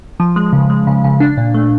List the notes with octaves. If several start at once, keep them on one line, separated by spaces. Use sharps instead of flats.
F3
G#3
C#3
G#3
C#3
C#3
D4
A#2
A3